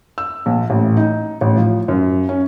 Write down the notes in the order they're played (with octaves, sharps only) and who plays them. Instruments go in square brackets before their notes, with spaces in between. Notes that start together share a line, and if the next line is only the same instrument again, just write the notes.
[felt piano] E6
A#1
A1
D#4
A1
F3
F#2
C#4